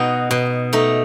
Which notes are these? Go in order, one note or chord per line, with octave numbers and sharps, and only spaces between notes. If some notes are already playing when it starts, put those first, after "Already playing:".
Already playing: B2 D#4 F#4
B2
A3 D#4